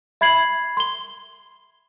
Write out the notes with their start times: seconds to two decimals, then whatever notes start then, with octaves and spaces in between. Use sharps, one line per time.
0.21 E5 B5 G#6 C7 F#7
0.77 C6 G7